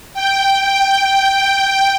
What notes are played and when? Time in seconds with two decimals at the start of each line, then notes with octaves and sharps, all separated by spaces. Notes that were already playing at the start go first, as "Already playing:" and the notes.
0.14 G5
0.61 G5